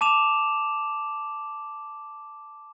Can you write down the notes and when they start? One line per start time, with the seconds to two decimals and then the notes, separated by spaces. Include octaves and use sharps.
0.01 A5 D6 E7 F7